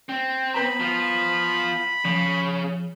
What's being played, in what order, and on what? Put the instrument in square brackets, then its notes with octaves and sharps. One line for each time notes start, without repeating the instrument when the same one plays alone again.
[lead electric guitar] C4
[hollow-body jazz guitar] B3 B4 A#5 [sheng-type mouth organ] B5
[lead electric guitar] F3 F4
[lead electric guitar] C#3 [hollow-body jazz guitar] F3